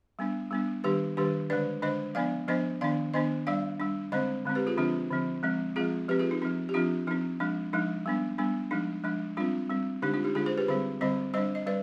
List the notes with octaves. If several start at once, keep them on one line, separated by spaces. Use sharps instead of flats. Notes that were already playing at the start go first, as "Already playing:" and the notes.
G3 B3 D4
G3 B3 D4
D#3 G3 D4 G4 B4
D#3 G3 D4 G4 B4
D3 G#3 D4 B4 D5
D3 G#3 D4 C5 D#5
F3 B3 D4 D5 F5
F3 B3 D4 C5 D#5
D#3 B3 D4 D5 F5
D#3 B3 D4 C5 D#5
G3 D4 D5 F5
G3 D4
D3 G#3 C4 C5 D#5
D3 G#3 C4
G4 B4
F4 G#4
D3 F3 C4 D4 F4
D3 F3 C4
F3 G#3 C4
F3 G#3 C4 F4 G#4
F3 C4 G4 B4
F4 G#4
D#4
F3 C4 D#4
G4
F3 C4 D4 F4
F3 C4 D#4
F3 G#3 D4
F3 G#3 D4 D#4
G3 B3 D4
G3 B3 D4
F3 G#3 D4 D#4
F3 G#3 D4
G3 C4 D4 F4
G3 C4
D3 G#3 D4 D#4 G4
D4 F4
D#4 G4
D3 G#3 D4 F4 G#4
G#4 C5
G4 B4
D3 G3 C4 G#4 C5
D3 G3 C4 C5 D#5
G3 D4 C5 D#5
D#5
G3 B4 D5